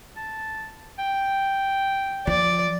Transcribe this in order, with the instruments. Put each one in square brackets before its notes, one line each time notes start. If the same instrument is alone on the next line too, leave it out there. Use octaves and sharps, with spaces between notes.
[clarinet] A5
G5
[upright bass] F3 [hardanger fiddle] D5